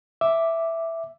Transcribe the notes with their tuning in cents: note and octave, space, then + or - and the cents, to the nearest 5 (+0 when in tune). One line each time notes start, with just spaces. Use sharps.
E5 +0 D6 +0